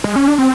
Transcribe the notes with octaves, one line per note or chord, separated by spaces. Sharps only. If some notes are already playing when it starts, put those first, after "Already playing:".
G#3
C#4
D4
C4